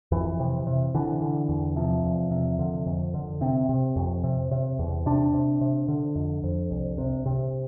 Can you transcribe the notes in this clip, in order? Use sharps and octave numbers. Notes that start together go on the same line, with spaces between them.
F2 E3
C3
C3
D3 E3
D3
E2
C3 F3
E2
C3
D3
F2
D3
C3 C4
C3
F2
C3
C3
E2
C3 D4
C3
C3
D3
F2
F2
C2
C3
C3